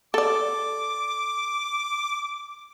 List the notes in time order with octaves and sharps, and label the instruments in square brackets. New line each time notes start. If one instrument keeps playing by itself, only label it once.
[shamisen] A4 D5 [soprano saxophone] D6